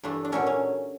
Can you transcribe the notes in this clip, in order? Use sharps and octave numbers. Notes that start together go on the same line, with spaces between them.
G2 E3 A3 D4
D4
A#2 F#3 A3 C#4
C#4